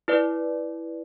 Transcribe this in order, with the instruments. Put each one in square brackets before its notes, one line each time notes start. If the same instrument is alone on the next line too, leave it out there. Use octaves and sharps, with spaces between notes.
[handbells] E4 B4 D5